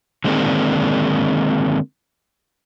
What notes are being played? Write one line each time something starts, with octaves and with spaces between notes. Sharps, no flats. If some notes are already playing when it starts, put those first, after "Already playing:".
D3 D#3 G#3 A#3 C4 D4